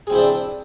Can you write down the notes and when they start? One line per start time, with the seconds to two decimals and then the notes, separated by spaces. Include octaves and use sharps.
0.07 G#4
0.10 C4
0.12 E4
0.15 C5
0.18 D4